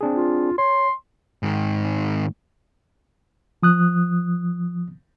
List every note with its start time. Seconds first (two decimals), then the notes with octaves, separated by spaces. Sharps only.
0.01 C4 D4 G#4
0.15 F4
0.58 C#5 C6
1.43 G#2 D#3
3.63 F3 D#6 F#6